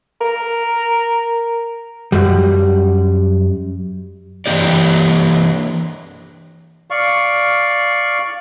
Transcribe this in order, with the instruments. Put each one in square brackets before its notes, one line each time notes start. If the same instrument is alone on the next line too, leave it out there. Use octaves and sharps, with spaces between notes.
[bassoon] A#4
[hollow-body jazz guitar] F#2 G3
[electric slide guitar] E3 A#3 D4 D#4 G4 D5
[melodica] D5 F5 C#6